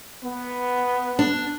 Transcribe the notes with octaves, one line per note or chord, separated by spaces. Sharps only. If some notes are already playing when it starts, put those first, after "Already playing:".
B3
D4